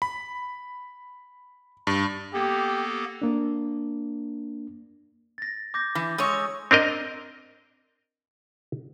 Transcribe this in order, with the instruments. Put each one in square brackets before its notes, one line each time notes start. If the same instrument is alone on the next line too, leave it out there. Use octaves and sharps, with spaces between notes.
[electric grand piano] B5
G2
[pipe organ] A#3 B3 A4 [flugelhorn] G4
[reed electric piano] A#3 D4
[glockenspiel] A6 A#6
D6 G6 A#6
[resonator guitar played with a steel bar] E3
[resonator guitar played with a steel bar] G#3 C#5 [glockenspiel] D#6 E6
[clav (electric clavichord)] C4 D4 A#4 D#5